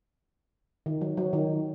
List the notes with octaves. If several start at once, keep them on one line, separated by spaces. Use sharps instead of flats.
D#3
F#3
F#3
D#3